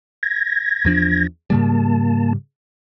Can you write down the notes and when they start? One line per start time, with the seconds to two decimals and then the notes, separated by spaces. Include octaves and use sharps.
0.23 G#6 A#6
0.85 E2 F3 D4
1.50 G#2 C#3 G3 A#3 A5